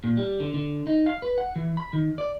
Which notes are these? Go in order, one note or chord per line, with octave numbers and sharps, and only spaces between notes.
A#2
G3
D3
D3
D#4
F5
B4
F#5
E3
B5
D#3
D5